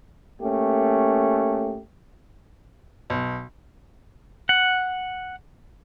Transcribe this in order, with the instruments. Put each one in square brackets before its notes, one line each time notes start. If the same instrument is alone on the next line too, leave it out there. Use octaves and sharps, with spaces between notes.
[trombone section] A3 A#3 C#4 G4
[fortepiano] B1
[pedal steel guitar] F#5